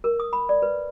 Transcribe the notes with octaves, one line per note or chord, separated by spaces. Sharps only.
A#4
D#6
B5
D5
B4